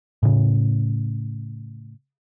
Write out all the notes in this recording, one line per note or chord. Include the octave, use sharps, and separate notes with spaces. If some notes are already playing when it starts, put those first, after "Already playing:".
A2 C#3